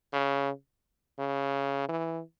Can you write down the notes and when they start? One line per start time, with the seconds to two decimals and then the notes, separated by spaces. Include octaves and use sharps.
0.13 C#3
1.19 C#3
1.89 E3